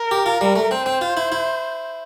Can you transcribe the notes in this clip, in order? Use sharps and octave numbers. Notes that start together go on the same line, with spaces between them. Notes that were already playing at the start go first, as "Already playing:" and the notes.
Already playing: A#4
G4
F4
G3
A3
C4 C5
C4
F4
E4
E4